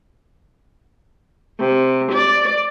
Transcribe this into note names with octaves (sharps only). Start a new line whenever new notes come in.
C3
D5